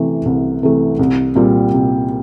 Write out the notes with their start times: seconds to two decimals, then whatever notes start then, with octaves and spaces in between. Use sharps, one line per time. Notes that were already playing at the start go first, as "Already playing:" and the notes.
Already playing: C3 E3 A3
0.25 C2
0.63 C3 E3 A3
0.99 C2
1.35 A#2 G3 C4 F4
1.73 C2